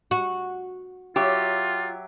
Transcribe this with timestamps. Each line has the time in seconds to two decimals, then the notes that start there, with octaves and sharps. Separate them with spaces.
0.11 F#4
1.16 F#3 F4 G4 E5